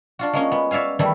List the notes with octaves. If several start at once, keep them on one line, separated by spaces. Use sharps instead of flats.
D4 F4 F#4
G#3 A#3 C#4
B3
C#5 D5 E5 F5 G#5
D#3 E3 G3 A3 E4